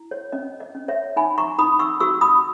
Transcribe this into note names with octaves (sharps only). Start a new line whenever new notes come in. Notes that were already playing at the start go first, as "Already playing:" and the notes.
Already playing: E4
C#5
C#4 D#5
D#5
C#4
C#5 E5
D#4 G#5 B5
A#5 C#6
D#4 B5 D#6
C#6 E6
F#4 C#6 E6
B5 D#6